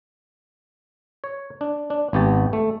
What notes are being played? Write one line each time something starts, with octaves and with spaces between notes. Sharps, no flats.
C#5
D4
D4
G#1 B3 G4 A5
A3